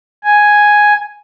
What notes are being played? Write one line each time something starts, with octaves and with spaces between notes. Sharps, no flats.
G#5